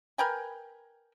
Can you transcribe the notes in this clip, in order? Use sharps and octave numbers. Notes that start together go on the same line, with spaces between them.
A#4 B4 G5 G#5